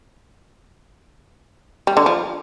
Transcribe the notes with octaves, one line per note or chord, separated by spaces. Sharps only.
G3
D3
F3